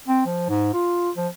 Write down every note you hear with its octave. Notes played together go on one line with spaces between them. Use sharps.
C4
F3
G#2
F4
F3